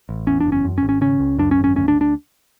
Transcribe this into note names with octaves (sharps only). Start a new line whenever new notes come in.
A1
E2 C#4
D4
F#1
C#4
F#2
C#4
G#1
C#4
C#3 C#4
C#2
F#2 D4
C#4
G#1
C#4
D2 C#4
D4
D4